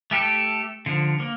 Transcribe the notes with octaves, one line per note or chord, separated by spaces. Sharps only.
A3 G4 A4
D3 F3
A#3